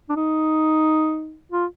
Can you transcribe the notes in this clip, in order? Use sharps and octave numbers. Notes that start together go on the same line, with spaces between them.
D4
D#4
F4